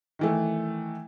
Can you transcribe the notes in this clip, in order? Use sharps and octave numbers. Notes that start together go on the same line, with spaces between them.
D#3 E3 A3